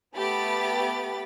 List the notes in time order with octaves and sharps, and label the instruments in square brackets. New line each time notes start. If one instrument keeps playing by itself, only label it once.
[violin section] A3 B3 G4 B5 A6